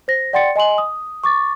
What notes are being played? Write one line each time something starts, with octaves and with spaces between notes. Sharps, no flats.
C5 A#6
D5 F#5 G5 C6 A6 C#7
D#5 G#5 C6 F#7
D#6
C#6 D6 A6